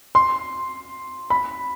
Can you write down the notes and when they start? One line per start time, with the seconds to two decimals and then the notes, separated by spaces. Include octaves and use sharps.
0.15 C6
1.30 B5